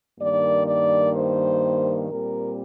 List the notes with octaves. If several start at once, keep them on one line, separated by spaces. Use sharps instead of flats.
G2 D#3 A#3 D5
D5
C5
A#2 G3 C4 A#4